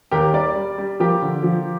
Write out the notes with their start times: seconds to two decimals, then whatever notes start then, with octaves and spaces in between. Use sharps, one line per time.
0.11 D#2 G4 A#4
0.33 G3 A#4 D5
0.56 G3
0.78 G3
1.00 F3 G4 A#4
1.22 D3
1.43 F3